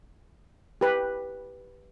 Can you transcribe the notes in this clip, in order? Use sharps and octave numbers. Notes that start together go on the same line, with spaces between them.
G4 B4